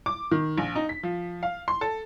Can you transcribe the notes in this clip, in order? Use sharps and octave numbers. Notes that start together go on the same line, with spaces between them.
D6
D#3
A#1
D#4
B6
F3
F5
C6
A4